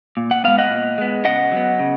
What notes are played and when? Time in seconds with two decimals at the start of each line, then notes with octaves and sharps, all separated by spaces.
0.17 A#2
0.31 F#5
0.44 G#3 B3 F5
0.58 D#5 F#5
0.70 A#2
0.98 G#3 B3
1.25 C#3 D#5 F#5
1.52 F#3 B3
1.79 C#3